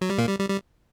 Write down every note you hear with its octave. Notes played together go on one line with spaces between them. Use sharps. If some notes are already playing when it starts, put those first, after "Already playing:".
F#3
G3
A#2 A#3
G3
G3
G3